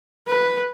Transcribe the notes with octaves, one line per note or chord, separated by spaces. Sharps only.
B4